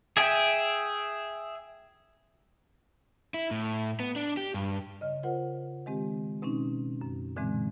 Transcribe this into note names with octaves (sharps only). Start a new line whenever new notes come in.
G#4 E5 G5 G#5
E4
A2
B3
D4
G4
G2
C#3 D#5
F4 A#4 C5 F#5
D#3 G#3 C4 G4
B2 C4 C#4 D#4
F#2
A#2 D3 E3 G#3 C4